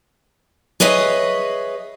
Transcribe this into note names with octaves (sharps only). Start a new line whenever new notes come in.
G#4 B4 C#5 D#5 E5